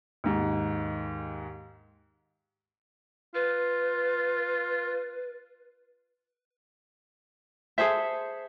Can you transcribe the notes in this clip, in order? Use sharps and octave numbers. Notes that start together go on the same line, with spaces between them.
D#2 G#2
F4 B4
G#4 A4 C5 E5